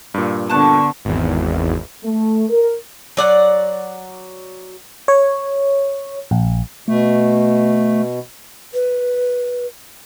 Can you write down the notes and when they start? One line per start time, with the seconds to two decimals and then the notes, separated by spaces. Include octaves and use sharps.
0.14 G2 A#2
0.50 D3 B3 A5 C#6 F#6
1.05 G#1 E2
2.04 A3
2.50 A#4
3.17 F#3 D5 F#5
5.08 C#5
6.31 A#1
6.88 B2 A3
8.74 B4